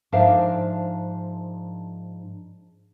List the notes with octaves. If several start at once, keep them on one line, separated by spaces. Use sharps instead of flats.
G#2 F3 D4 A#4 E5 F5